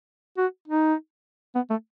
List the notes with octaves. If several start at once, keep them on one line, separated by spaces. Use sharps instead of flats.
F#4
D#4
B3
A3